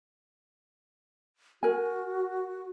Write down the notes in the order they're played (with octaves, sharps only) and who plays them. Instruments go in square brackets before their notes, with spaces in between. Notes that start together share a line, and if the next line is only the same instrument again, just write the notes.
[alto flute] F#4 [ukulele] A#4 G#5